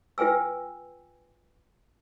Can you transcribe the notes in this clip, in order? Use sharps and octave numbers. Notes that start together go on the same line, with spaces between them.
F4 B4 G5 G#5 E6